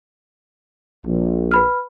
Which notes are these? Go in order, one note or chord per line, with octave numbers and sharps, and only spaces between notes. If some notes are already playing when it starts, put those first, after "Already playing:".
A#1
B4 B5 F6